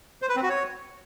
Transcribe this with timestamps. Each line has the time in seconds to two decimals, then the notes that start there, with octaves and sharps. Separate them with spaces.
0.22 C5
0.29 B4
0.36 C4
0.43 F#4
0.50 C#5